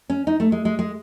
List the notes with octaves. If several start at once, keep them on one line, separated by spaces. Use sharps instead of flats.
C#4
D#4
A3
G#3
G#3
G#3